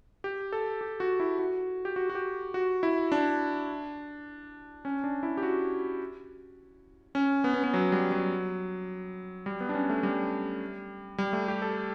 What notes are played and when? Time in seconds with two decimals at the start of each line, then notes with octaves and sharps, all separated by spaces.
0.24 G4
0.52 A4
0.81 G4
1.00 F#4
1.20 E4
1.39 F#4
1.85 G4
1.96 F#4
2.10 F#4
2.15 G4
2.54 F#4
2.83 E4
3.12 D4
4.85 C#4
5.04 D4
5.23 E4
5.37 G4
5.43 F#4
7.15 C#4
7.44 B3
7.54 C#4
7.63 B3
7.74 F#3
7.92 G3
8.12 F#3
9.46 G3
9.60 B3
9.69 D4
9.74 C#4
9.90 A3
10.03 G3
11.18 G3
11.33 A3
11.48 G4
11.62 A4